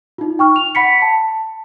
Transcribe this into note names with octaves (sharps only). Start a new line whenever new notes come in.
D#4 F4
G5 C#6 F6
F7
F#5 B5 B6 C#7
A5